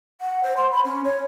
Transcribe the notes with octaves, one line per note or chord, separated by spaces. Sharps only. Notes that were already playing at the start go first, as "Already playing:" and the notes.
F#5
C5
C6
B5
C#4
C#5